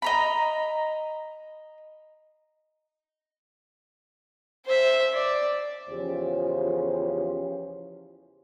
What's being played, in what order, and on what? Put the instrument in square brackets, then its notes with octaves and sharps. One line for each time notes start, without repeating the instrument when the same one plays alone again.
[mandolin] D#5 A#5 B5
[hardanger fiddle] C5 E5
D5
[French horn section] E2 C#3 F3 C#4 G4 C5